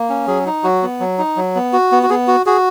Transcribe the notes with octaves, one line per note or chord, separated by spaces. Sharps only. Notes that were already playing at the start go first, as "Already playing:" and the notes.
Already playing: A#3
C#4
F#3 G#4
D#4
F#3 F#4
B3
F#3
D#4
F#3
B3
F#4
B3
F#4
B3 G#4
F#4
F#4 G#4